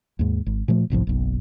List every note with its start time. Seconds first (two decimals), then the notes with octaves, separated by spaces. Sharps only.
0.19 D#2 G#2
0.46 G#1
0.68 A#2 F3 A3
0.90 G1 C2 A2 F3
1.07 F#1 B1